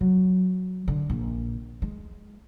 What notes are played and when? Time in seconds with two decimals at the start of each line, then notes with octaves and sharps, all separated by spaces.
0.01 F#3
0.88 D3
1.10 A#1
1.82 G#3